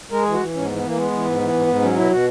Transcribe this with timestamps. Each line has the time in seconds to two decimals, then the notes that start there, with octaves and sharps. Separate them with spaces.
0.11 G#3 A#4
0.22 E3 G#4
0.33 F#4
0.40 E3
0.54 G#2 C#4
0.65 B3
0.69 E3
0.76 B3
0.83 E3 A#3
0.96 G#3 B3
1.11 E3
1.25 G#2
1.39 E3
1.53 G#2
1.67 G#2
1.81 F#3 C#4
1.96 B2 E4
2.11 B2 F#4